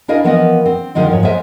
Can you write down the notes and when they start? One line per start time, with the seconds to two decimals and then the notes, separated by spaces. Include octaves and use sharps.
0.08 D4 E4 A#4 D#5 F5 G#5
0.24 E3 F3 B3 A#4 B4 D#5
0.66 C4
0.95 D3 D#3 F3 G#3 D#4
1.10 E2 G#2 F3 C#5
1.23 G#3 B3 A#4 C5 E5 G#5